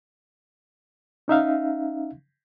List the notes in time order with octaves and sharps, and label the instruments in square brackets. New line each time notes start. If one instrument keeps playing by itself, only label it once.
[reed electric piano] C#4 D#4 E5 F5